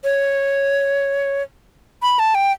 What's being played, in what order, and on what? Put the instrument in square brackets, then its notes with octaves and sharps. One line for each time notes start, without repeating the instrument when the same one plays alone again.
[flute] C#5
B5
A5
G5